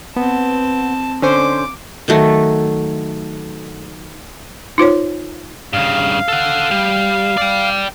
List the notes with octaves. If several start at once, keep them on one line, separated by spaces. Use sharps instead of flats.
B3 C4 A5
D3 C#4 C5 D6
D#3 F#3 A3
D#4 F4 C5 C#5
G2 C#3 F5
A4 F#5
G3
D5 G5